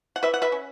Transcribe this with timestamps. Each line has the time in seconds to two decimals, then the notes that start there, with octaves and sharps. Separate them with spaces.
0.16 F#5
0.23 E3 B4 E5
0.34 F#5
0.42 B4 E5
0.52 C#4